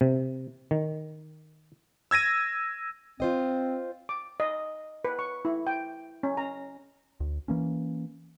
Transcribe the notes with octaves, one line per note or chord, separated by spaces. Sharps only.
C3
D#3
E6 G#6 A#6 D#7
C4 F4 C5 D#5
D6
D#5
B4
C#6
E4
G5
C#4
A#5
D2
E3 A#3 C#4